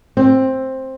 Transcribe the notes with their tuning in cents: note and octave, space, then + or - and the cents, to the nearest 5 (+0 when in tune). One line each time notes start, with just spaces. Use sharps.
C4 +10